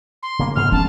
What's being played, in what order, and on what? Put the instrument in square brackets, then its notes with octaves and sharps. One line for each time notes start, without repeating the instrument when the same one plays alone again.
[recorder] C6
[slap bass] C#3 A#3 C#4
[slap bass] D2 G#2 B3 [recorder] F6
[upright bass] C#4 [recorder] A5